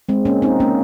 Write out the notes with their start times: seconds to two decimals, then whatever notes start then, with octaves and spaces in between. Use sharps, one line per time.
0.09 G#3 C4
0.25 A#3 C#4
0.42 C4 D#4
0.60 A#3 C#4